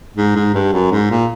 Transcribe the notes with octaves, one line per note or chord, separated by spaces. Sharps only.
G#2
G#2
G2
F#2
G#2
A#2